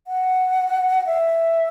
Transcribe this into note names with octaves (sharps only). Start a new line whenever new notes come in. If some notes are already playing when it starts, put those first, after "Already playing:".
F#5
E5